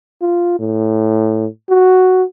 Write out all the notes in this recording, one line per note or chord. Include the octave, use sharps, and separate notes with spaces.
F4
A2
F#4